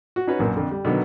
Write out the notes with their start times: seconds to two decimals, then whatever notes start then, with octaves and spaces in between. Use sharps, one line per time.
0.16 F#4
0.27 C#4 D#4 F#4 B4 C#5
0.39 A#1 F#2 A#3
0.56 F2 D3
0.71 G3
0.85 B2 D3 D#3 F#3 B3